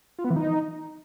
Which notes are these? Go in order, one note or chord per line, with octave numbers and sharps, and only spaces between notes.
F4
B3
E3
D#4